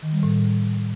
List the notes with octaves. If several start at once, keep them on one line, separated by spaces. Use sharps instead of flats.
D#3
G3
A2